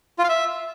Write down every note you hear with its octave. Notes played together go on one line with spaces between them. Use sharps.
F4
F5
E5